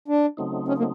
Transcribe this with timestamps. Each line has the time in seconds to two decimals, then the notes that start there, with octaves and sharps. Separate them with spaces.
0.08 D4
0.37 C#3 F#3 A3 C4 D#4
0.68 C#4
0.78 A#3